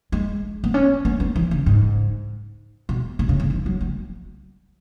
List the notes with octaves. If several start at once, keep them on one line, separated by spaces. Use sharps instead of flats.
G#3
B3
C#4
B3
B3
E3
C#3
G#2
B2
B2
C#3
C#3
E3
F#3
B3